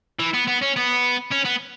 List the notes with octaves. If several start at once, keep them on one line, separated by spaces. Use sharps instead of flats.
E3
B3
B3
C#4
B3
C#4
B3